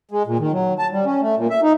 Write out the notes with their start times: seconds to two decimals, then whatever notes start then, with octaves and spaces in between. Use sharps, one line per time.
0.11 G#3
0.27 A#2
0.39 D#3
0.52 F#3
0.79 A5
0.92 G3
1.05 C#4
1.21 A3
1.37 A#2
1.50 E5
1.62 D#4